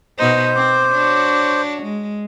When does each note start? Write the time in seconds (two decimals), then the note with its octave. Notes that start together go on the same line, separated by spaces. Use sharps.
0.18 B2 B3 D#4 C5
0.56 C4 D6
0.92 D4 F#4 C#5
1.83 G#3